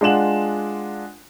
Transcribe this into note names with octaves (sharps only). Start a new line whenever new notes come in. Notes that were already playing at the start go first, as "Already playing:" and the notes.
G#3 D4 F4 F#5 E7 F#7